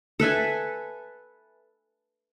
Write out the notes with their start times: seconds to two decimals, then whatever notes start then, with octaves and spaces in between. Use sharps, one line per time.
0.20 A4 B4 E5 G#5